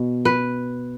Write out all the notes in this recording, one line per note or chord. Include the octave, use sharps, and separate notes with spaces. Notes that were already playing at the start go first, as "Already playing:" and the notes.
Already playing: B2
B4